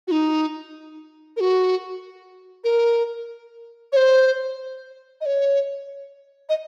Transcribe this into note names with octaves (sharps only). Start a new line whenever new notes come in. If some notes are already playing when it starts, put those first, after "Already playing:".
F#4
D#4
A#4
F#4
A#4
C#5
C5
D#5
C#5
D#5